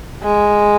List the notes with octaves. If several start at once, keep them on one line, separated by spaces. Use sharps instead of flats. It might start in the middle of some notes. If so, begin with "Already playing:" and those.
G#3